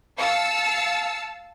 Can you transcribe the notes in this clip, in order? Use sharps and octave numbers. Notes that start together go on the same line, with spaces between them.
F5 A5 E6 A6 C#7